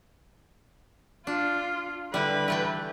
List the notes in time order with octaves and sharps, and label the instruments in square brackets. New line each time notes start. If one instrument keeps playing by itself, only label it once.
[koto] D4 [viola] F4
[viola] D3 B4 [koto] G3 E4
[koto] E3 A3 G5